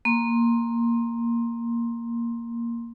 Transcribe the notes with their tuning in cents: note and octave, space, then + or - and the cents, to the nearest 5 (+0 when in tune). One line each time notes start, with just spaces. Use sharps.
A#3 +0 C6 +15